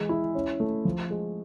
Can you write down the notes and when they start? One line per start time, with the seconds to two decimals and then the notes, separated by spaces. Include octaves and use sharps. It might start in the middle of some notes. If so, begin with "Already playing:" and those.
Already playing: E3 G#3
0.09 E4
0.35 C#4
0.60 A3
0.85 F3
1.10 G#3